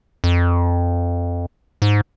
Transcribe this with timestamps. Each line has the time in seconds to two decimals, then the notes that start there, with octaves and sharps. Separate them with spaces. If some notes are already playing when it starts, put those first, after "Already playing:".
0.24 F2
1.82 G#2